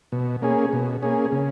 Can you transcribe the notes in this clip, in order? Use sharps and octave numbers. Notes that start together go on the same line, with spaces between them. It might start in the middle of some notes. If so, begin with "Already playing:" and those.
B2
A#3 C#4 G#4
B2
A#3 C#4 G#4
C#3